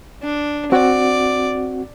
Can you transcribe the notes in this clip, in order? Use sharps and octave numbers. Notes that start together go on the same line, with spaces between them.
D4
C4 F#4 D5 F#5